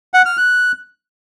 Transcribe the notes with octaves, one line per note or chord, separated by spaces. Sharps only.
F#5
F6
F#6